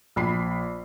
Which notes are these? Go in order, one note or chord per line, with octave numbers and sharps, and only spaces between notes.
A#1 B5 C7